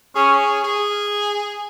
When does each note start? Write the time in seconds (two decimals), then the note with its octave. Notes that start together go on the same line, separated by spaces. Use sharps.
0.16 C#4 G#4
0.64 G#4